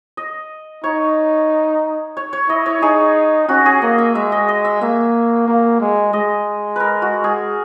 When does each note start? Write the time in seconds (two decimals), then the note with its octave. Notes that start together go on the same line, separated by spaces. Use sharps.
0.17 D#5
0.84 D#4 C#5
2.17 C#5
2.33 C#5
2.49 E4 D#5
2.66 C#5
2.82 D#4 G#4
3.48 C#4 F#4
3.66 G#4
3.82 A#3 D#5
3.98 E5
4.15 G#3 E5
4.32 D#5
4.48 D#5
4.65 E5
4.81 A#3 E5
5.48 A#3
5.81 G#3
6.13 G#3 D#5
6.76 A#4 B4
7.02 F#4
7.24 G#4